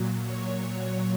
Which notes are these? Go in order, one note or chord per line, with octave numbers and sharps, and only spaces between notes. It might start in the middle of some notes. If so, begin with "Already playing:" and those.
Already playing: A#2 F#3
C#5